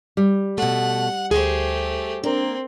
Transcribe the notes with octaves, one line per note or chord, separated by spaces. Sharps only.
G3
B2 A3 F#5
D2 A3 G4 G#4 C5
A#3 C4 D4 A#4